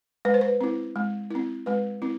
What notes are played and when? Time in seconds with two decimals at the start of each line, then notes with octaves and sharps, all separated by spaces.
0.25 G#3 B4
0.34 C5
0.41 B4
0.61 C4 E4
0.96 G#3
1.31 C4 E4
1.66 G#3 B4
2.02 C4 E4